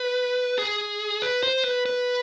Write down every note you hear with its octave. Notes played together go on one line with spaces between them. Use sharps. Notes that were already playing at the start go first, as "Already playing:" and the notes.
Already playing: B4
G#4
B4
C5
B4
B4